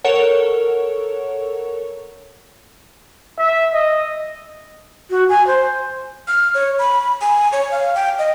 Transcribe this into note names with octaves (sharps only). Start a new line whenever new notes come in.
A4 A#4 C#5 F#5
E5
D#5
F#4
G#5
C5
F6
C#5
B5
G#5
C#5
F5
G5
D#5